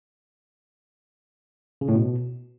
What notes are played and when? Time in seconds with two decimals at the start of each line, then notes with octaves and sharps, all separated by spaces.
1.81 C#3
1.88 A2
1.95 B2